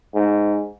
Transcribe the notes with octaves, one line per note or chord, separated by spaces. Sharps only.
G#2